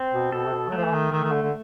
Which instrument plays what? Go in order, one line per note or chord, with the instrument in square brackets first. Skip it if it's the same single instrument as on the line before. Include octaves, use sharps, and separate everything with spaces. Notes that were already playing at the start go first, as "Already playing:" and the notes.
Already playing: [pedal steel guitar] C4
[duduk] B2
[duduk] B2 [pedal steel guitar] A4
[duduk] C3
B2
F#3
[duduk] F3 [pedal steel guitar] A3
[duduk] E3
D#3
[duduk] D#3 [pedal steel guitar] A3
[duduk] D#3
D3
D3